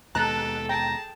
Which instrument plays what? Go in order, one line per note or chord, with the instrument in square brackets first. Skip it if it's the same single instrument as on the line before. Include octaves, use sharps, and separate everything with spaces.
[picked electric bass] D#2 B2 G#3 [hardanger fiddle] G4 A4 [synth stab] A5 A#5 F#6
[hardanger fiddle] G#4 A5 [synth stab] G5 [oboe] A#5